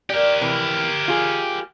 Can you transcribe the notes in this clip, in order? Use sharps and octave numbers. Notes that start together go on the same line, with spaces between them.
G4 A#4 D5
C3 E3
F4 G#4